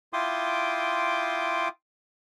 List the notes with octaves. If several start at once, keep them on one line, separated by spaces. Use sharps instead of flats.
E4 F4 G5 C6 D6 D#6